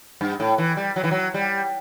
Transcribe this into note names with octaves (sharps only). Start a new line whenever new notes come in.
G2
A2
E3
G3
F#3
E3
F#3
G3